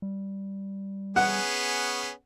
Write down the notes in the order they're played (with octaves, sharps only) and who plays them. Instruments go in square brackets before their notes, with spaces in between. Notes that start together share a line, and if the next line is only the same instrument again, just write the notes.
[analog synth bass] G3
[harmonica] B3 C#4 G#4 [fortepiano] F#5